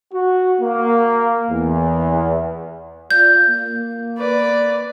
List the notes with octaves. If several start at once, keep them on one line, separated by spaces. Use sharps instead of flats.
F#4
A#3
E2
F4 D5 G6
A#3
B4 D5